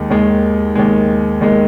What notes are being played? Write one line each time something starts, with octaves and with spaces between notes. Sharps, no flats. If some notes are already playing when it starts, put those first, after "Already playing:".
Already playing: D#2 D#3 G#3
D#2 D#3 G#3
D#2 D#3 G#3
D#2 D#3 G#3